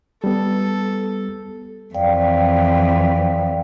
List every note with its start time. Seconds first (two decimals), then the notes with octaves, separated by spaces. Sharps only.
0.24 G3 B3 A4
1.94 F2 E3 D5 F5 G5